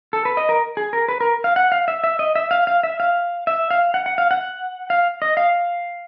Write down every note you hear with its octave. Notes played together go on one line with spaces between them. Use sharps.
A4
B4
D#5
A#4
G#4
A#4
B4
A#4
F5
F#5
F5
E5
E5
D#5
E5
F5
F5
E5
F5
E5
F5
F#5
F#5
F5
F#5
F5
D#5
F5